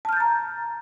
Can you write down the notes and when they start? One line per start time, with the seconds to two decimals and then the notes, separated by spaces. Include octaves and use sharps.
0.05 A5
0.09 F6
0.13 G6
0.16 A6
0.20 A#5